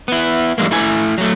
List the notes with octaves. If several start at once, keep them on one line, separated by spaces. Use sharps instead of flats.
B3 E4
E3 G3 G#3 A#3
A3 E4 G#5
F#3 A3